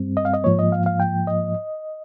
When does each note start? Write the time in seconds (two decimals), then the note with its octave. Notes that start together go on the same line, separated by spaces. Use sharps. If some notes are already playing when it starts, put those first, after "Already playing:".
Already playing: G2 G3 C4
0.17 D#5
0.25 F5
0.34 D#5
0.44 G#2 F3 A#3 C#5
0.59 D#5
0.72 F5
0.86 F5
1.00 G5
1.27 D#5